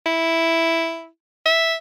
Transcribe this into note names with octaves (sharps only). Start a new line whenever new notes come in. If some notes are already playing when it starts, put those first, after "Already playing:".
E4
E5